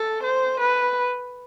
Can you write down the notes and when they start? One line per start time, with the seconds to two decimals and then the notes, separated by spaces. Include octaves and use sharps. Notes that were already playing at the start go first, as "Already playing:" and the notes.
Already playing: A4
0.24 C5
0.60 B4